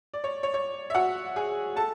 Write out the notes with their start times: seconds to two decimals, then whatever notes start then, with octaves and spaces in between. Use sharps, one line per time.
0.14 D5
0.24 C#5
0.43 C#5
0.54 C#5
0.90 E5
0.95 F#4 F#5
1.36 G#4 G#5
1.76 A4 A5